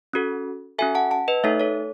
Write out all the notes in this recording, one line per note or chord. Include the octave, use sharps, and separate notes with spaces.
C#4 F#4 A4
C#4 F#4 A4 E5 G#5
F#5 A5
F#5 A5
B4 D#5
A3 D#4 A4 C#5 E5
A4 C#5